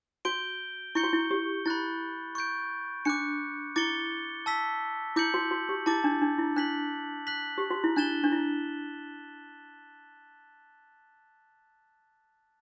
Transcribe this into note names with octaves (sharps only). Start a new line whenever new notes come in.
F#4 G6 D7 G7
E4 C#6 G6 C#7 G7
F#4
E4
G4
E4 B5 F#6 A6
C#6 G6 D7
D4 D6 F#6 C#7
E4 D6 A6 C#7 G7
A5 E6 B6
E4 D6 G6 C#7 F#7
F#4
F#4
G4
E4 A5 D6 A6
D4
D4
E4
D4 F#6 B6 F#7
F#6 B6 F#7
G4
F#4
E4
D4 F#6 A6 E7 G7
D4
E4